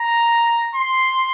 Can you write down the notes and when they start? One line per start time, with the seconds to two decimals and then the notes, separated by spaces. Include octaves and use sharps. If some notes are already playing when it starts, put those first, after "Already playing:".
Already playing: A#5
0.75 C6